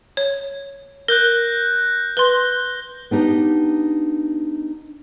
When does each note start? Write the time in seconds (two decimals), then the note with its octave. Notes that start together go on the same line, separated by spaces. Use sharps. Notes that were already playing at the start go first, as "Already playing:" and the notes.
0.17 C#5
1.08 A#4 F#6 G6 A#6
2.17 B4 C6 G7
3.11 B3 D4 D#4 G4